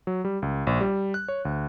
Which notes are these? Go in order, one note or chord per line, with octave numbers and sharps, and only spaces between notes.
F#3
G3
C#2
A#1
G3
F#6
C#5
D2